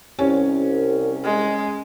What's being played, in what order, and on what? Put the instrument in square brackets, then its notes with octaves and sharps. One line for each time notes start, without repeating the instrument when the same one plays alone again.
[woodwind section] C2 [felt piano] C#4
[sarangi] G#3